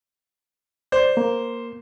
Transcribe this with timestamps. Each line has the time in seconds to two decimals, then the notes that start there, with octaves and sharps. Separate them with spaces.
0.92 C5 D5
1.17 A#3